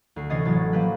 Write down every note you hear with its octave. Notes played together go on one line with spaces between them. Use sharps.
D2 C7
C3 E3 C#4 D#5 A6 C7
A1 A2 F#3 A6
F3 F#3 A#3 G4 B4 B6